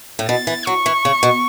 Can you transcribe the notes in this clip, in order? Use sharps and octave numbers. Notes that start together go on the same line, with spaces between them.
A2
B2 A6
E3
F#3 C#6
E3
C#3
B2